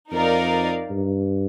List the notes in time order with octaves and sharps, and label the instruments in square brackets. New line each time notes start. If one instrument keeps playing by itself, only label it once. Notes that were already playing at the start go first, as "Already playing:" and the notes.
[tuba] F2 [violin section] D#4 A#4 D5 F5
[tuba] G2